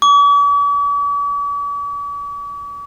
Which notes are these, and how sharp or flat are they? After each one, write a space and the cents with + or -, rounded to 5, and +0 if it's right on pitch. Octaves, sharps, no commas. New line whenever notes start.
D6 -45